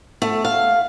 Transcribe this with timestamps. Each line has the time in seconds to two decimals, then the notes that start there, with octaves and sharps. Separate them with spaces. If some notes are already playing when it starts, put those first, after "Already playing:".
0.22 A3
0.45 F5